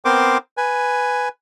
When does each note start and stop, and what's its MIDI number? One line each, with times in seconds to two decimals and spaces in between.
0.05 0.38 59
0.05 0.38 60
0.05 0.38 70
0.05 0.38 72
0.05 0.38 84
0.05 0.38 86
0.57 1.29 71
0.57 1.29 80